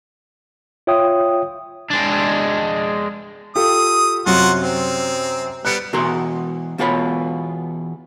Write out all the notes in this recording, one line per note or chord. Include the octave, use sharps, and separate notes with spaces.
F4 C#5 E5 G5 D#6
G#3 D4
F4 G4 A4 D#6
F#2 C3 F#3 F4 F#4 F#5
C4
G3 B3 F#6 C#7
B2 E3 F#4 A#4 A#5 C6
E2 B2 F4 G#4 C#5 B5